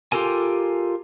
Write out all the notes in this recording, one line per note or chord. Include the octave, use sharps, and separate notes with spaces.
F4 G4 A4 A#4 G#5